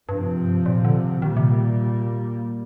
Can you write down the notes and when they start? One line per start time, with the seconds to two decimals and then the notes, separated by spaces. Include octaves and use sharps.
0.08 G2 C3 F3 C4
0.66 A#2
0.85 D3
1.22 A#2 D#3 G3 A#3
1.37 C3